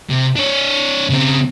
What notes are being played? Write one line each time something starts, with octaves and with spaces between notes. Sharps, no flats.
C3
D4 C#5
C#3 C4